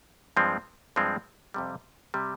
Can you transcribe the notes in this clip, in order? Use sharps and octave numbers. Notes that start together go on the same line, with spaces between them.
G2 F3 G#3 C4
G2 F3 G#3 C4
F2 C3 G3
C3 G3